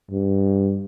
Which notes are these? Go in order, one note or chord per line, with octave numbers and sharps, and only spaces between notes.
G2